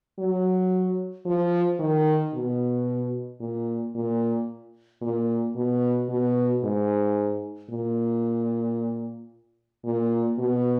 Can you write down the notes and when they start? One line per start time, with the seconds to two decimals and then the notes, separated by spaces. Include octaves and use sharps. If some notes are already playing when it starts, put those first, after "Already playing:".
0.19 F#3
1.26 F3
1.80 D#3
2.34 B2
3.41 A#2
3.95 A#2
5.02 A#2
5.56 B2
6.10 B2
6.64 G#2
7.70 A#2
9.85 A#2
10.39 B2